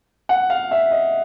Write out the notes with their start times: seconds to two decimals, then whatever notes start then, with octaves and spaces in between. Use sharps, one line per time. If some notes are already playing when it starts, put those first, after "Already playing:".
0.29 F#5
0.50 F5
0.71 E5
0.91 D#5